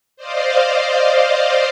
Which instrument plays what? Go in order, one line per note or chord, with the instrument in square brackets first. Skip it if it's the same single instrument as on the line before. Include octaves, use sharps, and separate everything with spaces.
[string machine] C5 D5 D#5 F5